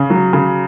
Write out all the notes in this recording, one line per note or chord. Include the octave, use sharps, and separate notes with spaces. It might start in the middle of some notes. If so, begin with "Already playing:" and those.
Already playing: C#3
F#3
C#3